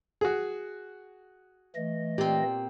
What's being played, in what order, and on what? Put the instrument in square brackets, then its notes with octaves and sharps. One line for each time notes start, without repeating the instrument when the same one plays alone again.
[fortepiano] F#4 G#4
[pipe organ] E3 A3 D#5
[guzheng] A#2 C4 [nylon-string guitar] B3 G4